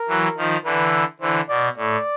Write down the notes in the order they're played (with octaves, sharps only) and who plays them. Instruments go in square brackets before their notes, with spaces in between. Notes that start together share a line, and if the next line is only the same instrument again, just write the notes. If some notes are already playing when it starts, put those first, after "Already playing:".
Already playing: [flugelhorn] A#4
[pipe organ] E3 F#3
D#3 F3
[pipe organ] D3 E3 [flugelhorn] B4
[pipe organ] D3 E3 [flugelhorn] C5
[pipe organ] B2 [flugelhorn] D5
[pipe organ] A2 [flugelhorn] D5